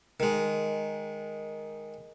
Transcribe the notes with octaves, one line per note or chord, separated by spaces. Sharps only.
D#3 G#3